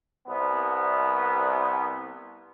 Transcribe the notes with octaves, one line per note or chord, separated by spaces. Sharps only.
C2 B3